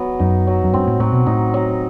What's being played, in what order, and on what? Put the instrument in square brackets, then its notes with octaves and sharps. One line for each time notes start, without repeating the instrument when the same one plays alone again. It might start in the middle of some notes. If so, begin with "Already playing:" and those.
Already playing: [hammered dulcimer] F#3 B3
[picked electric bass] F#2 [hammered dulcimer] D#4
[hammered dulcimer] F#3
[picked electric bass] F#2
[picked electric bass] G2 [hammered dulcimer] C4
[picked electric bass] A2
[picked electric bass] A2 [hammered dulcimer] F#3
[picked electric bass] B2
[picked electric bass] A2 [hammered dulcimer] D#4
[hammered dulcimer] F#3